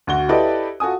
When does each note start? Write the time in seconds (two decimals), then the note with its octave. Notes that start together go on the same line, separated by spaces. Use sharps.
0.07 D2 F#4 G7
0.29 E4 G4 A4 B4 D5 D#5
0.80 F4 F#4 A4 G#5 D#6